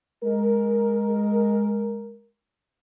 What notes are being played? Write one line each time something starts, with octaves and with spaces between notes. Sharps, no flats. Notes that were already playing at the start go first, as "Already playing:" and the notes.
G#3 A#4